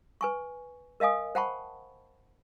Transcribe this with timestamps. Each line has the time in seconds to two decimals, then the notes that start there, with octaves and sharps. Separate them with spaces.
0.21 B4 G#5 C#6
1.00 A#4 D#5 F5 G#5 D#6
1.35 C5 F#5 G5 A5 B5 C#6